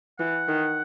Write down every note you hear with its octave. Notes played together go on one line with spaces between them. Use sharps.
E3 F#5
D#3